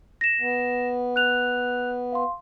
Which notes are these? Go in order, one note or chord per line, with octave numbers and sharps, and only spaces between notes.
A#6 E7
B3
F#6 F7
F5 C6